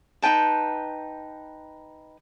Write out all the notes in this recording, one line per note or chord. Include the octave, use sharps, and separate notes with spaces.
D#4 B4 G5 A5